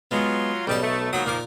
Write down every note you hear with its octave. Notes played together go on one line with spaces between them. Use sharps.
F#3 G#3 B3 F4
B1 C#3 G3 D#4 A5
A3
D#3 F3 F#3 A#3 B5 D#6
A#2 D#3 F3 A#3 A#4 D6